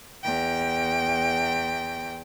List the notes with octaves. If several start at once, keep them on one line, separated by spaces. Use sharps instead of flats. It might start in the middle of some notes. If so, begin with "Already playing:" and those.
E2 G5